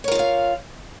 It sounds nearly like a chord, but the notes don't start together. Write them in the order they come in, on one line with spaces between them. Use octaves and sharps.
C#5 A#4 F4 D#5 F5